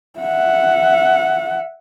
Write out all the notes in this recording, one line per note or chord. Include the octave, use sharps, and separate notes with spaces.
E5 F#5